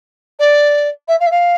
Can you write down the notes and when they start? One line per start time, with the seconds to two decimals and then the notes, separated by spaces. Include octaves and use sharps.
0.39 D5
1.08 E5
1.20 F5
1.27 E5
1.31 F5